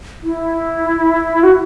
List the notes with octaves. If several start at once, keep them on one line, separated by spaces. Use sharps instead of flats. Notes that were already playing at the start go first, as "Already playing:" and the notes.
E4
F#4